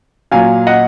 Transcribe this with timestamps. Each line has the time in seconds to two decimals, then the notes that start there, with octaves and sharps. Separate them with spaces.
0.31 A#2 F#3 F5 G#5
0.67 D#5 F#5